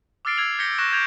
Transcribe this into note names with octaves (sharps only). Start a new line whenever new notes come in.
D6 E6 F6 A6 C7 D7
E6 G#6 C7 F7 F#7
G6 G#6 A#6 B6 C#7 G7
C#6 E6 F#6 A#6 E7
D6 G6 G#6 A#6 D7 F7